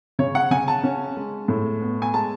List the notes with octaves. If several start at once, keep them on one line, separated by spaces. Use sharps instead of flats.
C#3 C#5
F#5
C#3 G#5
A5
C#4
G#3
A2
B3
G#5
G#3 A5